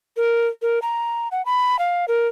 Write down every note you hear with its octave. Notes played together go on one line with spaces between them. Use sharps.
A#4
A#4
A#5
F#5
B5
F5
A#4